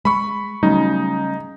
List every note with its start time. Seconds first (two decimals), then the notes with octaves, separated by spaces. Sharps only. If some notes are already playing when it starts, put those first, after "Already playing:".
0.05 G#3 B5 C#6
0.63 C#3 F#3 G3 A3 D#4